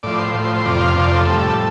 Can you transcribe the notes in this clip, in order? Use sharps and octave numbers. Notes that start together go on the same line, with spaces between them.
A2 F3 D5
C5
A2 F3
C5
C5
F2 C3 F3 D5
F5
F2 C3 F3 D5
A4
A2 G3